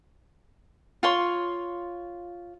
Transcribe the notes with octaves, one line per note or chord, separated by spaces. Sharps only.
F4 C#5 C6